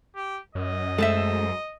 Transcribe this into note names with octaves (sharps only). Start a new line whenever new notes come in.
G4
F#2 D#5
G#3 A3 A4 C5 E5